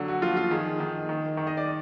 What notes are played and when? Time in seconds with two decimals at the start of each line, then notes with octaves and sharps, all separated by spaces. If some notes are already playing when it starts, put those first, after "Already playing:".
Already playing: D3 F#3
0.08 F#4
0.22 F3 F4
0.37 F4
0.51 D#3 G#4
0.80 D#3
1.09 D#3
1.37 D#3
1.47 D#5
1.57 D5